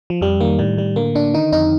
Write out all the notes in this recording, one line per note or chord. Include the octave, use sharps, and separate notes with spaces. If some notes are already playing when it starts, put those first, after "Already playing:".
F3
F2 G3
D#3 A#3
A2 G3
A2 G3
D3 A#3
D3 D4
D#3 D#4
F2 D#4